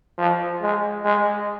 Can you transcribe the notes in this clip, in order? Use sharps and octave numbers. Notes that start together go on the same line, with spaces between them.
F3
G#3
G#3